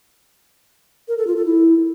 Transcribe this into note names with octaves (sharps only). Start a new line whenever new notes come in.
A#4
A4
F4
A4
E4